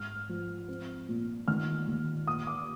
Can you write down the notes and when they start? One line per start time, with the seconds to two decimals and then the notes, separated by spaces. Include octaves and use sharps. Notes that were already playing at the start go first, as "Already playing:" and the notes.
Already playing: G#2 F6
0.29 F3
0.68 C4
1.08 A#2
1.48 D#3 F6
1.87 D#2
2.27 A#2 D#6
2.47 D6